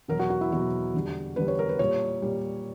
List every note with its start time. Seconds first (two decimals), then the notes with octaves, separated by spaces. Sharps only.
0.08 E2 B2 F#3 A#4
0.19 F#4
0.30 F#4
0.41 E4
0.51 E2 B2 F#3 F#4
0.94 E2 D3 G3
1.36 E2 D3 G3 B4
1.48 C#5
1.59 A#4
1.69 B4
1.79 A#2 G3 C#5
2.22 A#2 G3